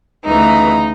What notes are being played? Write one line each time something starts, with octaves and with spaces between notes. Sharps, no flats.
D2 C#3 E3 D#4